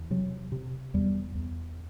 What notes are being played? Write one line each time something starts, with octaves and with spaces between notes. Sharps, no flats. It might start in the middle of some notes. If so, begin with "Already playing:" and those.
Already playing: E2
C3 F#3
C3
E2 G3
E2